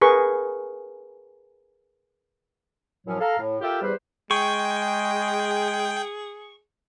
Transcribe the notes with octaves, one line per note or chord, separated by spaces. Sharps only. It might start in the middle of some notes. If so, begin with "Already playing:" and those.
G#4 A#4 B4 C#6
F#2 A2 F3 F#3 C#4
A4 F5 A#5
A2
F4 G4 A4 A#4 E5 G5
E2 G3 G4 B4 C5
G#3 G#4 G5 C#6